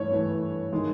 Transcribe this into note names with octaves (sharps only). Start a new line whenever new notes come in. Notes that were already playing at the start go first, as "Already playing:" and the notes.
Already playing: G2 E3 A3 C#5
G2 E3 A3
D#3 G#3